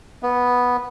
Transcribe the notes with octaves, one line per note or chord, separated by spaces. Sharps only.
B3